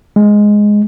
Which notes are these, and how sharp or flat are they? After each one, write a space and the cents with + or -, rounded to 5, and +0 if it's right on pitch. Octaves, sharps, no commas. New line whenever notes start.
G#3 +0